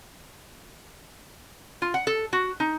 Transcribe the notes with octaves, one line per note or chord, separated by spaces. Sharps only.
F4
F#5
A4
F#4
D#4